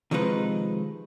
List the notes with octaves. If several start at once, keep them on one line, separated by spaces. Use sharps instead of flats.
C3 D#3 F3 G#3 D#4 B4